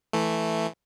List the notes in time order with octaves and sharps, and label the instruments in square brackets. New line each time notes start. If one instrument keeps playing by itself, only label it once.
[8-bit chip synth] E3 A3